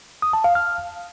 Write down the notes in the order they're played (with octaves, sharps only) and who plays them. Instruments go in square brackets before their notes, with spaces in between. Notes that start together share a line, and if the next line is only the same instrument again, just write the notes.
[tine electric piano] D#6
A5
F5
F6